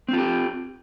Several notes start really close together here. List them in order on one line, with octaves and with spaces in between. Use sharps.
C4 F4 G4